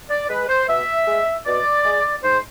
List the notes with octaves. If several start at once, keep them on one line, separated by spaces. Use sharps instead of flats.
D5
G#3 B4
C5
B2 E5
G#3
B2 D5
G#3
G#2 C5